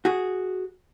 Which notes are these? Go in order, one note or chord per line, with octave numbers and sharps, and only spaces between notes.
F#4 G#4